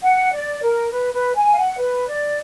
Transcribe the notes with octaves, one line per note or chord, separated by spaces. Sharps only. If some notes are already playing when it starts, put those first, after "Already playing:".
F#5
D5
A#4
B4
B4
G#5
F5
F#5
B4
D5